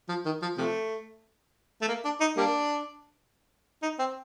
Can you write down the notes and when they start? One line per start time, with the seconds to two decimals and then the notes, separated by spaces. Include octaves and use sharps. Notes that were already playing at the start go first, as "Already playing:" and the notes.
0.09 F3
0.25 D#3
0.42 F3
0.57 C3 F3 A3
1.82 A3
1.88 A#3
2.05 D4
2.20 D#4
2.37 G3 A#3 D4
3.83 D#4
3.99 C4